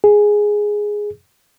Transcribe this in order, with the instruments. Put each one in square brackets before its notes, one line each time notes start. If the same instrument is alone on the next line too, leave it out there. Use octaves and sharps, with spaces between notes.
[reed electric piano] G#4